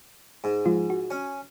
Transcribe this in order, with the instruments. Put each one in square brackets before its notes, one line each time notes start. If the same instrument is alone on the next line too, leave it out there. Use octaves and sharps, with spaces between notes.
[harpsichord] G#2
[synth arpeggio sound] F3 G#3 F4
F#4
[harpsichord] C#4